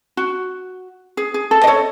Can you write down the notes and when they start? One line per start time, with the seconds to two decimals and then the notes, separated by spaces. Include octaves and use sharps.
0.17 F#4
1.17 G#4
1.34 G#4
1.51 A4
1.64 D#5
1.67 A4 C#5